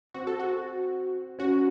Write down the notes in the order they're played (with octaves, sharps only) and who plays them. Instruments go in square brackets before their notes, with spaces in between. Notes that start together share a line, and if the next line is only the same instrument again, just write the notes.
[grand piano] C4 [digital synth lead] F#4
[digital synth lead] A4
F#4
[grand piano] C#4 [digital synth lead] F#4